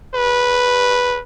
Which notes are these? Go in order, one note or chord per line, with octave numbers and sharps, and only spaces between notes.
B4